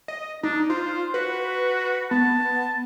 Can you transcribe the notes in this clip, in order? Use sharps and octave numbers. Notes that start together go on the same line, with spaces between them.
D#5
D4 D#4
F4 C5
F#4 B4
B3 A5